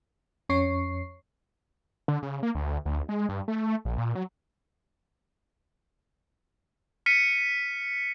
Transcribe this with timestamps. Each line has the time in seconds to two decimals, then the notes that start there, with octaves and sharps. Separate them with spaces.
0.49 F2 C#4 C#5 C#6 C7
2.08 D3
2.23 C#3
2.43 A#3
2.55 D2
2.86 D2
3.09 G#3
3.29 G2
3.48 A3
3.85 A#1
3.98 A#2
4.15 F#3
7.06 F6 B6 C#7 D#7